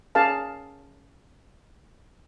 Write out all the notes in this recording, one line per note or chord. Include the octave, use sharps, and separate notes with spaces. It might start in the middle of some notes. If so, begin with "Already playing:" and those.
C#4 G#4 A#4 F5 A5